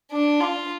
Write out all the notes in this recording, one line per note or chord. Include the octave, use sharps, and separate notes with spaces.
D4
F4